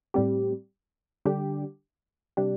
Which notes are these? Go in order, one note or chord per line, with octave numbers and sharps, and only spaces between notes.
A2 G3 C4 G4
D3 G3 D4 G4
C3 G3 D4 G4